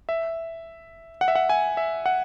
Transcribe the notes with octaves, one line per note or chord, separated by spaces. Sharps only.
E5
F#5
E5
F#5
G#5
E5
F#5